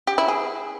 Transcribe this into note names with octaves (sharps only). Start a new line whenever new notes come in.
G4
E4
G#4